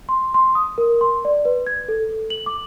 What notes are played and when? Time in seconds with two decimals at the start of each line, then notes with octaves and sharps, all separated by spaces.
0.09 C6
0.34 C6
0.55 D#6
0.78 A#4
1.01 C6
1.25 D5
1.45 B4
1.67 G#6
1.88 A4
2.30 F#7
2.46 D6